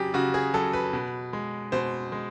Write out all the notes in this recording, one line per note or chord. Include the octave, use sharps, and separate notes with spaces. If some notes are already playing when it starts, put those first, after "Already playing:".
Already playing: C#3 F#3 G4 G#4
C#3 F#4
G#4
F#3 A4
B4
B2
G#3
B2 C5
G#3